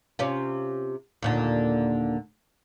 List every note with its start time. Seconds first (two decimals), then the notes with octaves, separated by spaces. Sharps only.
0.19 C3 C#4 F4
1.22 D#2 A#2 D3